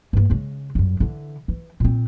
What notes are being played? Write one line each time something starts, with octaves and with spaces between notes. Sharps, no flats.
G2 A#3
C#3 G#3
G1 F#2
D3 E3
E3
A#2 C4